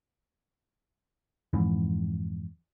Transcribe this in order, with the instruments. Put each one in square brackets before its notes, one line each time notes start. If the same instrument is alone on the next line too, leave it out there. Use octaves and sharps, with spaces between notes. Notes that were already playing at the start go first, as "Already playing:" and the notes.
[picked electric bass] F2 G#2 E3